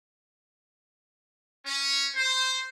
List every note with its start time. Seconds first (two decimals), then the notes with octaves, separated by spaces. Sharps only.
1.65 C#4
2.16 C5